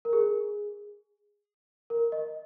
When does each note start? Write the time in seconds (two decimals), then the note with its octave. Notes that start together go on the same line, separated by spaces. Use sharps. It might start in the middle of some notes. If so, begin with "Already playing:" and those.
0.05 A#4
0.13 G#4
1.90 A#4
2.12 D#5